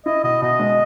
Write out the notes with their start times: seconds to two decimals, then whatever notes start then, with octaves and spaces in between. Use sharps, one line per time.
0.06 E4 D#5
0.24 B2 D#5
0.42 B2 D#5
0.59 G#3